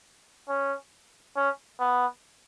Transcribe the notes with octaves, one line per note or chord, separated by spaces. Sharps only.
C#4
C#4
B3